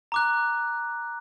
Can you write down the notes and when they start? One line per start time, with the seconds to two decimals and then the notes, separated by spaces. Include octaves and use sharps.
0.12 A#5 D6 F#6